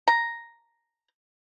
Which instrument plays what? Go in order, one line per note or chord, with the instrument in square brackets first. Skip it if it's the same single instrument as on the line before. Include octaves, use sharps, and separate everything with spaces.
[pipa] A#5